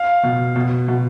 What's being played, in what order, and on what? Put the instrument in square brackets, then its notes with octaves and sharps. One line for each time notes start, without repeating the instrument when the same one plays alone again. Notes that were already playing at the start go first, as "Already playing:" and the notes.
Already playing: [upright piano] F5
B2
B2
B2